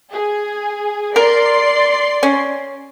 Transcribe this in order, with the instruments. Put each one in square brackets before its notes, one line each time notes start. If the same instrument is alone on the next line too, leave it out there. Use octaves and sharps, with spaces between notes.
[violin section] G#4
[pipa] A#4 [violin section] D5 C6 C7
[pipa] C#4